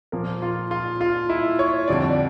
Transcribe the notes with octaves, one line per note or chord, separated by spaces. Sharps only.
A#2 F3 A#3 A#4
F4
F4
F4
E4
C#5
F2 D3 G3 D5
D5